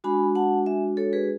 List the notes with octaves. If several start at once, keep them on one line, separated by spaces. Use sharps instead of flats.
G#3 D4 F#4 G#5 B5
F#5 A5
E5 G#5
A4 C#5
G#4 B4